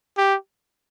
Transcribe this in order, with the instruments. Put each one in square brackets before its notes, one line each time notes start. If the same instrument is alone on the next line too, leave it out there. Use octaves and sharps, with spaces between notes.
[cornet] G4